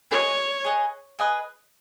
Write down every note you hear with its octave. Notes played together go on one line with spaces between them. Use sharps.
G#4 B4 C#5 D#5 G#5
G#4 B4 D#5 G#5
G#4 B4 D#5 G#5